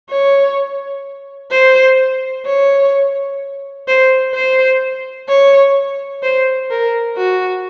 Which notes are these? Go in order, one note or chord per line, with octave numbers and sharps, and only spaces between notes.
C#5
C5
C#5
C5
C5
C#5
C5
A#4
F#4